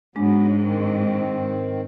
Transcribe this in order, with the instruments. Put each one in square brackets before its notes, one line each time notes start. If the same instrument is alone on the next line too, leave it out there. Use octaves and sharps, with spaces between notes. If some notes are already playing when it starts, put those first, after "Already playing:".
[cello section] G#2 [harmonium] F#3 B3 [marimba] G#3 D4
[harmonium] D#3 C4